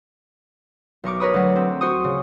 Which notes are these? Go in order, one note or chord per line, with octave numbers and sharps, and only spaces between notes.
B1 A#4 C#6 D6
A#4 B4 C#5 B5 D#6
D2 F#3 F#5
C4
F#4 C5 C#6 D#6
C#3